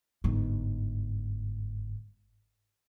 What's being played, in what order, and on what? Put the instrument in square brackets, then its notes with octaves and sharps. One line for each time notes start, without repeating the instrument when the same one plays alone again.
[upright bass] G1 G#2